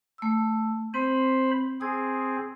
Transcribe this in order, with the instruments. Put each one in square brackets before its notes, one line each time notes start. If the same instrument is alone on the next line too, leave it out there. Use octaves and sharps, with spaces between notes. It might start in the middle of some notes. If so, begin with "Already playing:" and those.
[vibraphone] A3 E6
[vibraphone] C4 [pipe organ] C5 B5
[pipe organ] C4 G#4 [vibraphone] D#6